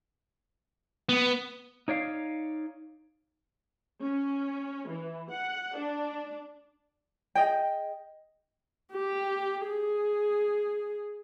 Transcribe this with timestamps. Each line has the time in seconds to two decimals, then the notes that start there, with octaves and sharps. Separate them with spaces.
1.09 B3
1.88 D#4 C#5 D5 F5
4.02 C#4
4.88 E3
5.31 F#5
5.76 D4
7.35 G#4 D#5 G5
8.92 G4
9.68 G#4